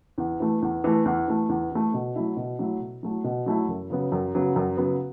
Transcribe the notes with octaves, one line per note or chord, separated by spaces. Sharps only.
E2
E3 A3
E2
E3 A3
E2
E3 A3
E2
E3 A3
B2
F#3 A3 E4
B2
F#3 A3 E4
B2
F#3 A3 E4
B2
F#3 A3 E4
F#2
C#3 F#3 B3
F#2
C#3 F#3 B3
F#2
C#3 F#3 B3